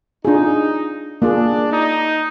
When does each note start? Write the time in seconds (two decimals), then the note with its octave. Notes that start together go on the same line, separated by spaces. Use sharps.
0.25 D4 D#4 F4 G#4
1.21 A#3 D4 F4 G#4
1.71 D#4